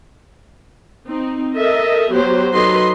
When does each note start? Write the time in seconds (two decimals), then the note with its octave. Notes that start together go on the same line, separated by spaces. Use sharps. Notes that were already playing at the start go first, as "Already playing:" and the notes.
1.07 C4 D#4
1.56 A4 A#4 D#5 E5
2.12 F#3 B3 G4 C5
2.53 F#3 D#4 A4 B4 D#5 C6